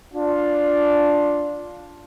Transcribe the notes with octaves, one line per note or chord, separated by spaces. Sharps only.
D4 F4